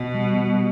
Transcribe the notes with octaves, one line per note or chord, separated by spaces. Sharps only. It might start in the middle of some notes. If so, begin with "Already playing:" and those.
Already playing: B2
G3
G3